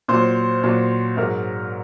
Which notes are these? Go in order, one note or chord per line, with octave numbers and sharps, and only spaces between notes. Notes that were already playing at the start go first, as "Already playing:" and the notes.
A#2 F#3 C5
A#2 F#3
G#2 F#3 A#4